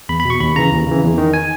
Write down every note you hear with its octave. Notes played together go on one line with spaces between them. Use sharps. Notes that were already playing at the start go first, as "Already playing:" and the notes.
E2 B5
B5
B2
C#6
D#2 B5
C#3 E3 A#5
D#2
C#3 E3
E2
D#3
G#5